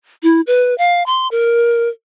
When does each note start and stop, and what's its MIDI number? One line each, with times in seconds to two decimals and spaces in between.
0.23 0.41 64
0.47 0.77 71
0.78 1.03 77
1.06 1.28 84
1.31 1.89 70